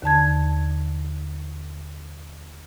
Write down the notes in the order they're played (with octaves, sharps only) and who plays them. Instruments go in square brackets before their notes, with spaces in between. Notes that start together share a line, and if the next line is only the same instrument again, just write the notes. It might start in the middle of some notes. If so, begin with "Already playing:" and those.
[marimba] D#2 D3 A5 G#6